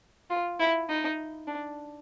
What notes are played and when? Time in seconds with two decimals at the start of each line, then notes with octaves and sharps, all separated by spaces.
0.30 F4
0.60 E4
0.89 D#4
1.48 D4